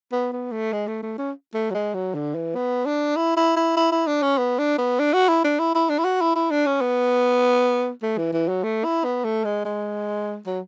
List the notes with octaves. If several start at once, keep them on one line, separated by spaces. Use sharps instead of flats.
B3
B3
A3
G#3
A3
A3
C#4
A3
F#3
G#3
F#3
D3
E3
B3
D4
E4
E4
E4
E4
E4
D4
C#4
B3
D4
B3
D4
F#4
E4
D4
E4
E4
D4
E4
F#4
E4
E4
D4
C#4
B3
A3
E3
E3
F#3
A3
E4
B3
A3
G#3
G#3
F#3